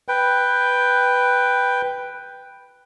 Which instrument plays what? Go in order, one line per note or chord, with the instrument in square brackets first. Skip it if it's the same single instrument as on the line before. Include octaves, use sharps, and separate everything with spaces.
[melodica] B4 G5